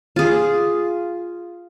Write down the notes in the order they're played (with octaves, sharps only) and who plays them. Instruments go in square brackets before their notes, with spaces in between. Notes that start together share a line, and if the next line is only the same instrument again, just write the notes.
[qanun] F4 G#4